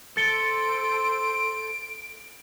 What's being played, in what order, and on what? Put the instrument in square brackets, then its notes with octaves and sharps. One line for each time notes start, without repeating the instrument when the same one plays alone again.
[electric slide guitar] A4 [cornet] C5 [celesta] A6 C#7 G7 [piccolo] D7